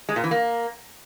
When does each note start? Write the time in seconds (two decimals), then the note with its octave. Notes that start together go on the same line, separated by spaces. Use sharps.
0.09 G#3
0.16 A#2
0.24 E3
0.31 A#3